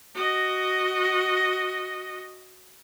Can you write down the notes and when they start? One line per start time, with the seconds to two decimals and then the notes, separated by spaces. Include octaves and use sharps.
0.15 F#4 D#5